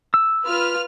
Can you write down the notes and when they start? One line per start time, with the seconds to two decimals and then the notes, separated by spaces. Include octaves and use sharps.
0.14 E6
0.45 F4 B4 F6